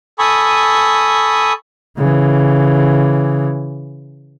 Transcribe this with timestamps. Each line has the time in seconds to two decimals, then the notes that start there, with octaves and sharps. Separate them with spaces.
0.19 A4 G#5 B5 C#6 D#6
1.98 C#3 E3